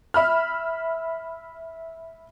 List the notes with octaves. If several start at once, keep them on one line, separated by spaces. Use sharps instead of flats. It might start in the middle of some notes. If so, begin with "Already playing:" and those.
E5 B5 F6